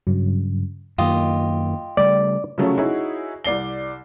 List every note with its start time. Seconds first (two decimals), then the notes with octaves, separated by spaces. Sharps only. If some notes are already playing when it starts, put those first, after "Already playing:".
0.07 G2 C#3 F#3
0.98 F#2 D#3 A#3 F4 G4 D#5
1.97 C#3 G3 A3 D5
2.58 C#3 F3 F#3 A3 C#4
2.78 D#4 E4 F#4 G#4 C#5
3.44 C2 D5 C7 G7